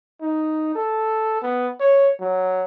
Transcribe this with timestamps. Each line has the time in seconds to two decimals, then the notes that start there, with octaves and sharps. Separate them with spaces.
0.21 D#4
0.75 A4
1.42 B3
1.80 C#5
2.21 F#3